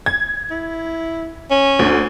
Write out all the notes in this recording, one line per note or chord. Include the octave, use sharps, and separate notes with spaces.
G#6
E4
C#4
D2